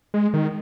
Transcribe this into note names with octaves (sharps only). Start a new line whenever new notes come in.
G#3
D#3